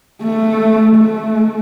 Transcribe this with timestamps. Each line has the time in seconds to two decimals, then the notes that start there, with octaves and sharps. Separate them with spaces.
0.22 A3
0.96 A3